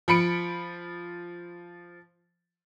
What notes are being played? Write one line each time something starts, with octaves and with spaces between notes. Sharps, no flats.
F3 B5 C#7 D7